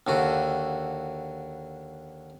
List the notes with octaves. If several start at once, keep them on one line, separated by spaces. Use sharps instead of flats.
D#2 D3 F#4